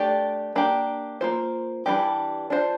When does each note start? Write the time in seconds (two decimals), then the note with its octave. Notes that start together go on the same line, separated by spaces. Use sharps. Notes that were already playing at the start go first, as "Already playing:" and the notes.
Already playing: A3 D4 G4 D5
0.55 A#3 D4 G4
1.21 A#3 F4 C5
1.86 E3 G3 A#3 D4 G4
2.50 D4 F4 C5